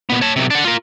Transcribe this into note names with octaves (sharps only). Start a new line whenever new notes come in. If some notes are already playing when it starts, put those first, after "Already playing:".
A#2 B3
C#5 A5
B1 C3
D4 F#5
F4 A#4